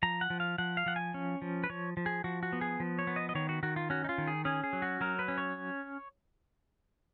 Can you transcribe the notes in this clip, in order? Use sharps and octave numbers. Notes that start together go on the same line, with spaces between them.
F3 A#5
F#5
F3
F5
F3 F#5
F5
F3 F#5
G#5
C#4
F3
B4
F3 C#5
F3
G#4
F3 F#4
F#4
B3
G#4
F3
C#5
B3
D#5
D#5
D#3 C#5
F#4
D#3 F#4
F4
C#4 F#4
D#4
F4
D#3
G#4
C#4 G#4
G#4
F#3
F#4
F#3 A#4
B4
C#4
C#5